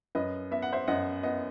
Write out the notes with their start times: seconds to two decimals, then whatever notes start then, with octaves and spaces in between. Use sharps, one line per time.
0.15 F#2 B4 D#5
0.51 B3 E5
0.62 F#5
0.73 C5 E5
0.88 F#2 D#5 F#5
1.23 B3 D#5 F#5